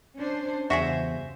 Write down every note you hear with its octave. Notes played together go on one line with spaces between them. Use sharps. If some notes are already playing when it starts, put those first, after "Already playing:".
C#4 D4 C5
E2 G2 C#3 F#4 G#4 C5 E5